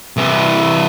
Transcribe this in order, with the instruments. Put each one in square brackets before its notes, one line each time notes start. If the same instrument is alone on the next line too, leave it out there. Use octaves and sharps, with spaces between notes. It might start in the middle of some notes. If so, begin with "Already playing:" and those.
[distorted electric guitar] C2 E3